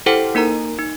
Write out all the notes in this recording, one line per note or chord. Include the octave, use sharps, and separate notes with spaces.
E4 G4 A4 C5 F#5 G5
A#3 D#4 A#4 A#5
D#4